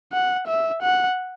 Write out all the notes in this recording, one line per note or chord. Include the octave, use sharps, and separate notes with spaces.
F#5
E5
F#5